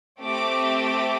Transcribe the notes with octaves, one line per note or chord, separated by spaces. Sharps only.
A3 C4 G4 D6
D6